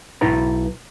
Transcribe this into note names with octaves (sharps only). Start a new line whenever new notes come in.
B1 E4 B4 A#5